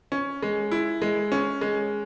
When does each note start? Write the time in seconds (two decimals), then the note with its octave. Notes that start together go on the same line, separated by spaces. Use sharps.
0.12 C#4
0.42 G#3
0.72 E4
1.02 G#3
1.32 C#4
1.61 G#3